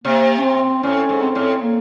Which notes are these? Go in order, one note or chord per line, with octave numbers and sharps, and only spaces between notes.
C3 A#3
C#4
C4
A2 C#4
G#2
C4
A2
A#3